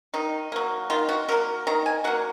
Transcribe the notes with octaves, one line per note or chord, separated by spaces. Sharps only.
D#3 D#4
F#3 A#3
D#3 F4
F#4
F#3 A#3 A#4
D#3 A#5
G#5
F#3 A#3 F#5